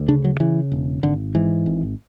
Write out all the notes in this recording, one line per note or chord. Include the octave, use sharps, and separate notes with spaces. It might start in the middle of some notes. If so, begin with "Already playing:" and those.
Already playing: D2
C#3 D4
F#3
C#3 E3
E1
G#1 D3
G#2 E3
G#1